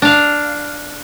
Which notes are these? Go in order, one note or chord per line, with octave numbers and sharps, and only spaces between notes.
D4 F5